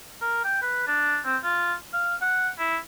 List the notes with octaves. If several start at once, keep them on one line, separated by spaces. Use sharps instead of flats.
A#4
G5
B4
D4
C4
F4
F5
F#5
E4